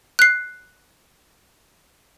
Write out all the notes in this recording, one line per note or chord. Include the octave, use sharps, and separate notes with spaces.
F#6 C7